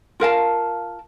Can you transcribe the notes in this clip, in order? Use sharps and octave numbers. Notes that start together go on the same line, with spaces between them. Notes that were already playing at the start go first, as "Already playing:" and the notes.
F4 A#4 F5 A5